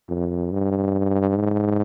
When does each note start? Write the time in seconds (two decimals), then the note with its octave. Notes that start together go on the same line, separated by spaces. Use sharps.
0.09 F2
0.52 G2
1.37 G#2